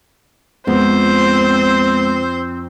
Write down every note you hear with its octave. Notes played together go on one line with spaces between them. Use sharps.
F2 G#3 B3 C4 C5